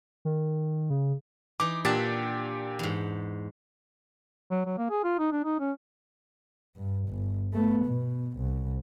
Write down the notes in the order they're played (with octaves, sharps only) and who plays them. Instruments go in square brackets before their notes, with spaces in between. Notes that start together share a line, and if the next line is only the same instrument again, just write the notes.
[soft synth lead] D#3
C#3
[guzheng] E3 D#4 [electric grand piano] D6
[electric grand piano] A#2 G4 A6 [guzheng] D4 E5 F#5
[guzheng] E2 G#2
[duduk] F#3
F#3
A#3
G#4
F4
D#4
D4
D#4
C#4
[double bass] G2
G1
A3 B3
B2
C2